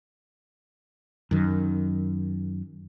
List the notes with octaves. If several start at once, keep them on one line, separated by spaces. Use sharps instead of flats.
F#2 D#3